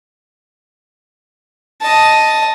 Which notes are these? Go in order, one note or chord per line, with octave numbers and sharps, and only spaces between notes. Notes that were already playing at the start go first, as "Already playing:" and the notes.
D#5 A5